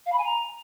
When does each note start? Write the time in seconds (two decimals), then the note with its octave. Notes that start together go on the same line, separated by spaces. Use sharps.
0.06 F5
0.12 B5
0.18 G#5
0.24 A#5